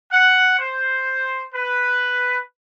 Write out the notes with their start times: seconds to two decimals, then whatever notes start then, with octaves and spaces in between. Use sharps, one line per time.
0.12 F#5
0.59 C5
1.54 B4